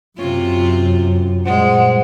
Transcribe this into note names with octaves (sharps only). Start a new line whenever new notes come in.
F#2 C3 C#4 E4 F4
A#2 G3 G#3 C5 F#5